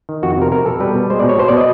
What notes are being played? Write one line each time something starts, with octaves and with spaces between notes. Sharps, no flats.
D#3
F2 F#4
C3 A#4
B2 A#4
B2 A4
G3 B4
B2
G#3 C5
D5
B2 C#5
B2 C5
D5
B2 D#5